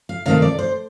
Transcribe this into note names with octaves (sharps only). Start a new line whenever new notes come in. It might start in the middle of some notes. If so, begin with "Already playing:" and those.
F5
C3 D#3 A3 F5
D5
C5